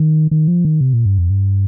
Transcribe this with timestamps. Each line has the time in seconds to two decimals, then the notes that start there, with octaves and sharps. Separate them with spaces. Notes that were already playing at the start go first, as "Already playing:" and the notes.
Already playing: D#3
0.31 D#3
0.48 F3
0.65 D#3
0.81 C3
0.93 A#2
1.06 G2
1.18 F2
1.30 G2